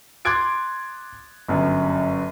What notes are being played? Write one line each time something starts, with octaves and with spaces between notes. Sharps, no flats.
C6 D6 F#6 G#6 A6 D7
G1 F#2